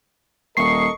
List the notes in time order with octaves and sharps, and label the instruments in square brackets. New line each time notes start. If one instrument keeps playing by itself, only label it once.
[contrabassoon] D#1 [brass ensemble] A4 A#4 D#5 [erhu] C#6 [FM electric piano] C7